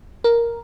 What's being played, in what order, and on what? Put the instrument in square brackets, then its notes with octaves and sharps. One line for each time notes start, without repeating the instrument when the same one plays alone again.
[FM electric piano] A#4